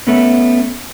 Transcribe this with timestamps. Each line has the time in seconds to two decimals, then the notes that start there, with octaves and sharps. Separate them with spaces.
0.07 A3 B3 C#4